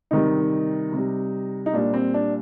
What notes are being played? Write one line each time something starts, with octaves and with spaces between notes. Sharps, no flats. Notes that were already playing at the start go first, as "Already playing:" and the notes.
C3 D#3 G3 D#4
C3
G3
D#4
A#2 G3 D4
C4
D4